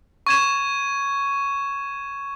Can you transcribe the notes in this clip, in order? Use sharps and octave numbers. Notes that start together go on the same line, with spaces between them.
C#6 G#6 E7